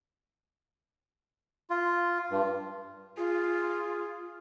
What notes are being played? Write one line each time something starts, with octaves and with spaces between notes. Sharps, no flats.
F4
G2
F4 G#4